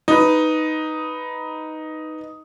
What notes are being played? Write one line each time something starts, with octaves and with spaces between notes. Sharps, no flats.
D#4 B4